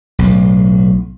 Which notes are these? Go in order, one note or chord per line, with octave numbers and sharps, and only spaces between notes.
B1 A2